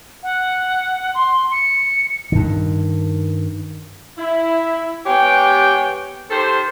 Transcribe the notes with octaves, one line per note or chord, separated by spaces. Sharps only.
F#5
C6
C#7
G2 D#3
E4
G#3 B3 G4 C#5 G5
D#3 G4 A4 C5